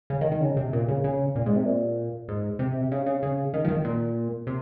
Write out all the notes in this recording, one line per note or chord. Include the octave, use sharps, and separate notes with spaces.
C#3
D#3
D#3
C#3
C3
A#2
C#3
C#3
A#2
G#2
C3
A#2
G#2
C3
C#3
C#3
C#3
D#3
F3
D#3
A#2
C3